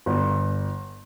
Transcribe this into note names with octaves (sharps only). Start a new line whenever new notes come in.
G1